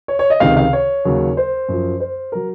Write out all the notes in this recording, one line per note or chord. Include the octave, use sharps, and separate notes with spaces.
C#5
C#5
D#5
C#2 C3 D#3 F5
F5
C#5
D#2 C#3 F#3
C5
F#2 F3
C5
F#3 A#4